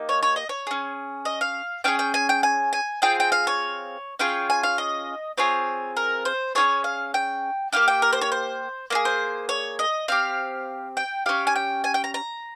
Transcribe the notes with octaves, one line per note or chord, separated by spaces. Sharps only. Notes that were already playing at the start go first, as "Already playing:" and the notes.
Already playing: A#3 D#4 G4
C#5
C#5
D#5
C#5
C#4 G#4
D#5
F5
C#4 F4 G#4 G5
G5
G#5
G5
G#5
G#5
C4 F4 G#4 G5
G5
F5
C#5
C#4 F4 G#4 G5
G#5
F5
D#5
C4 F4 G#4 C#5
A#4
C5
C#4 F4 G#4 C#5
F5
G5
A#3 D#4 G4 F5
G5
A#4
C5
C#5
C5
A#3 F4 G#4
C5
C#5
D#5
C4 G4 F5
G5
C#4 G4 F5
G#5
G5
G#5
G5
A#5
A#5